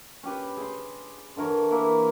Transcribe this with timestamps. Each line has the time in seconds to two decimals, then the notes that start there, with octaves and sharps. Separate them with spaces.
0.23 C#4 G4 B4
0.57 G#4 C6
1.36 D3 E3 A#4 C#5
1.71 E3 A#3 E4